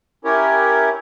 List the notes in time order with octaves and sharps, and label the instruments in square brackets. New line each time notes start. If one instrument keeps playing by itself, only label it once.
[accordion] C#4 E4 G4 A#4 C#5